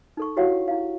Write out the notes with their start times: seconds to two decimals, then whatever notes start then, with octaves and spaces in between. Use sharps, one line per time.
0.17 D#4 A4 C#6
0.37 E4 F#4 G4 C#5 F5 F#5
0.68 E4 F5